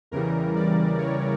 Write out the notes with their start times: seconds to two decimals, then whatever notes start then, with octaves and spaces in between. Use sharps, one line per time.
0.11 E2 C#3 E3 G3 A#4
0.56 D5
0.99 C#5